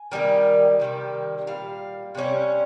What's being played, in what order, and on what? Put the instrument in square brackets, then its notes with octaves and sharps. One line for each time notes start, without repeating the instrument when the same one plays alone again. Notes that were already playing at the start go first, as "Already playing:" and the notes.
Already playing: [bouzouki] G#5
D#3 G3 A#3 D#4
C3 D#3 G3 A#3
A#2 G3 F5
C3 G3 C#4